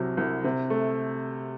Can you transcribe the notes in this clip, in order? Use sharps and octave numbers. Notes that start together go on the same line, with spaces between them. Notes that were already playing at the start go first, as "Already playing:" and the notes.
Already playing: C2 C3 F#3
C2
C3
A3